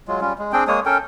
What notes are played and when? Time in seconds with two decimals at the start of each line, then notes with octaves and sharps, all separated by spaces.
0.08 F#3 G#3 F4
0.21 G3 C#4 F4
0.38 G#3
0.53 C4 D4 G#4 G5
0.68 G#3 A#3 C#5 D#6
0.86 C#4 A4 A#4 G5